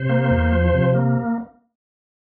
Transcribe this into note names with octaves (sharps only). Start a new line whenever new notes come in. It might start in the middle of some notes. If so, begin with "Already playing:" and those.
Already playing: C3 C5
A#3
E2
F3
C3
A#3